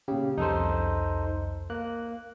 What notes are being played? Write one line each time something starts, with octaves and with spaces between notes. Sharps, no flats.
A#2 C#3 G4
C2 F2 D#4 A4 C5
A#3 F#6